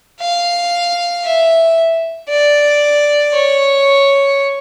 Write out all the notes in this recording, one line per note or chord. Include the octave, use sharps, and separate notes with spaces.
F5
E5
D5
C#5